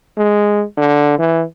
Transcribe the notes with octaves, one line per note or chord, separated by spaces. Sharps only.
G#3
D3
E3